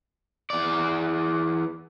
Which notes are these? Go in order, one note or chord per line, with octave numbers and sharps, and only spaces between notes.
E2 D5